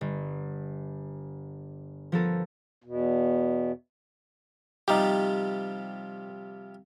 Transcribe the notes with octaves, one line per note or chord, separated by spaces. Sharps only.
G1
F3 B3 A4 A#4
E2 B2
C3 F3 G3 D#4 G4